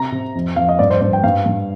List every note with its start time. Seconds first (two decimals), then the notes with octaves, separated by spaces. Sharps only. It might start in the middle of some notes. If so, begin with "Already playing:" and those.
Already playing: C3 A#5
0.12 C3
0.35 F2
0.56 F2 F5
0.69 D#5
0.79 G2 D5
0.91 C5
1.01 G2 C5
1.13 G5
1.24 G2 F5
1.46 G2